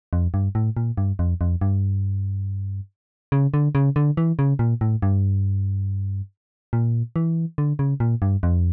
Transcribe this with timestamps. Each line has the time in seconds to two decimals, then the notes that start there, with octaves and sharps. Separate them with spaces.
0.13 F2
0.34 G2
0.55 A2
0.77 A#2
0.98 G2
1.19 F2
1.41 F2
1.61 G2
3.32 C#3
3.54 D3
3.75 C#3
3.96 D3
4.17 E3
4.39 C#3
4.59 A#2
4.81 A2
5.02 G2
6.73 A#2
7.16 E3
7.58 D3
7.79 C#3
8.00 A#2
8.22 G2
8.43 F2